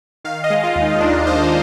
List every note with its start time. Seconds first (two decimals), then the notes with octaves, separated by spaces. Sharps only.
0.24 D#3 F5
0.44 D#5
0.50 G#3
0.63 F4
0.75 D#2
0.82 D#4
1.00 D#2 D4
1.26 D#3 C5